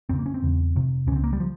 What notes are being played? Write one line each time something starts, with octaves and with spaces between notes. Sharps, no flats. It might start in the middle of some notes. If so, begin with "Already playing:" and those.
F2 C#3 C4
A#3
C#4
C4
E2 C#3
F2 C3
C#2 C#3 C4 C#4
A#3
G3
F3